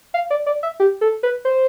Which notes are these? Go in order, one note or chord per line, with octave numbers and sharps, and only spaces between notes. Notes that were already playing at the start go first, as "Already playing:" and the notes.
F5
D5
D5
E5
G4
A4
B4
C5